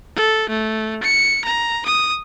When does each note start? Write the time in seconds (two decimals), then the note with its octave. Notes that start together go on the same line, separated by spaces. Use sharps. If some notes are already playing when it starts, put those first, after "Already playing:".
0.16 A4
0.50 A3
1.03 C#7
1.45 A#5
1.86 D#6